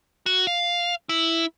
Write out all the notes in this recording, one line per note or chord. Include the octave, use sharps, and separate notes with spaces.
F#4
F5
E4